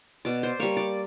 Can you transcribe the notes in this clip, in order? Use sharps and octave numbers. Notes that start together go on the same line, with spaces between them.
B2 D5
C5
G3 A#3 C#5
D5